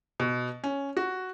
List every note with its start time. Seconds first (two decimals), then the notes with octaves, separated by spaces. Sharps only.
0.20 B2
0.64 C#4
0.97 F#4